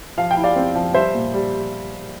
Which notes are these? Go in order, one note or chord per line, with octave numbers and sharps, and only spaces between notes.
F3 F5
G5
E4
D5 F5
C4
F3
G3 C5 E5
A#2
G3